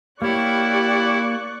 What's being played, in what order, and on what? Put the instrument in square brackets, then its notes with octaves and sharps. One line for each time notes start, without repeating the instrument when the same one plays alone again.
[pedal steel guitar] A#3 C#5 [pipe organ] E4 [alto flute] G4 [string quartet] D5 C#6 F#6